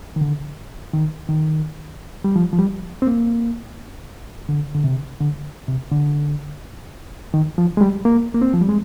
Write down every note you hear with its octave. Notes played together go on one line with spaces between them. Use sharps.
D#3
D3
D#3
D#3
G3
F3
F3
G3
C4
A#3
D3
D3
C3
D3
C3
D3
D#3
F3
G#3
G3
A#3
A#3
C4
F3
G3
G#3